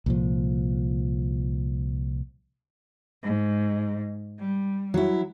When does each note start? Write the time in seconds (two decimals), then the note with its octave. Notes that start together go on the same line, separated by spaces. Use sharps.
0.06 C2 A#2 F3
3.23 G#2
4.39 G3
4.94 F#3 E4